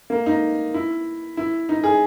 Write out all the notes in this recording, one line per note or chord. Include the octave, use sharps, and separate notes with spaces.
A#3
D#4
E4
E4
D#4
G#4